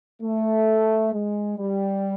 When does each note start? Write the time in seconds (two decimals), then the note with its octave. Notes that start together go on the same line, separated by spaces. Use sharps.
0.22 A3
1.13 G#3
1.58 G3